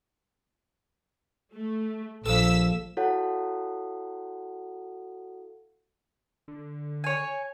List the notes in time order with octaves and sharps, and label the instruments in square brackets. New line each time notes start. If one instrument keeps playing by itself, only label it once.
[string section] A3
[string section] A#1 E6 B6 [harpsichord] F3 A4
[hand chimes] E4 F#4 A4 C#5 F5 F#5
[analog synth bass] D3
[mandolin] C#5 G#5